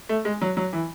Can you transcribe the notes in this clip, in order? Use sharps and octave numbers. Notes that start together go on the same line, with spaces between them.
A3
G#3
F#3
F#3
E3